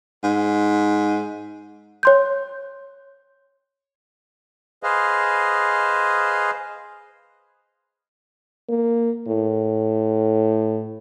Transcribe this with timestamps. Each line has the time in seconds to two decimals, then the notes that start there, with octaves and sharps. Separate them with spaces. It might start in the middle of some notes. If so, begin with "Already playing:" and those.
0.23 G#2
2.03 C#5 C6 G6
4.83 G#4 B4 C5 D#5 F5
8.69 A#3
9.28 A2